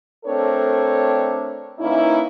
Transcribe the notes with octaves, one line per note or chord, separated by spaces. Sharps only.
A3 C4 D4 A4 A#4 C#5
E3 A#3 C#4 D#4 E4